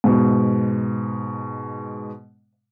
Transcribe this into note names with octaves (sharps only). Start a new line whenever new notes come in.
G#2 B2